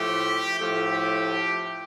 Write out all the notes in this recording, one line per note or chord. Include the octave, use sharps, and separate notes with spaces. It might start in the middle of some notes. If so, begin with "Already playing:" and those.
Already playing: A2 F3 A3 G4
A2 F3 A3 G4